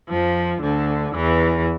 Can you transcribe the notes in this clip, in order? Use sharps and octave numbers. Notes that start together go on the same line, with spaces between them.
F2 F3
D2 D3
E2 E3